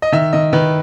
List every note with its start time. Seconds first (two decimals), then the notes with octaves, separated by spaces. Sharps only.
0.02 D#5
0.12 D#3 E5
0.33 D#3 D#5
0.53 D#3 B4